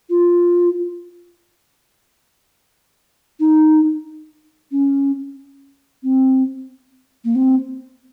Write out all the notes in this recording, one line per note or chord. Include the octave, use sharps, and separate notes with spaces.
F4
D#4
C#4
C4
A#3
C4